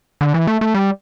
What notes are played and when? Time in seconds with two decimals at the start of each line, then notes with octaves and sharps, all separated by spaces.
0.21 D3
0.34 E3
0.47 A3
0.61 A3
0.74 G3